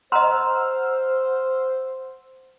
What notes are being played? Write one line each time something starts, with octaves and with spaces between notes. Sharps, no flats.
C5 D#5 F#5 A#5 C6 E6 F6